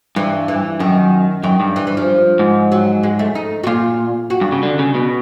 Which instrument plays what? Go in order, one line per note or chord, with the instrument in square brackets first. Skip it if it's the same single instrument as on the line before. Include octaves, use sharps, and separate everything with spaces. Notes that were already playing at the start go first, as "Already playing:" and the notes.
[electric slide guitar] G2 [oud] E3
[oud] E3
[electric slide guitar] F#2 [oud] D#3
[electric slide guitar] F#2 [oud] D#3
[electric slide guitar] G2
[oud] E3
E3
F3
[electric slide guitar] G#2
[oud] F#3
G#3
A3
D#4
F#4
[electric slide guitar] A#2 [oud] F4
[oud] F#4
[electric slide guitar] G2
C#3
D3
C#3
B2